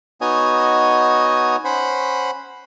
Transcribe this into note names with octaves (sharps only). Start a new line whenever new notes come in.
B3 D#4 F#4 C#5 D#5 G#5
C#4 C5 F#5 B5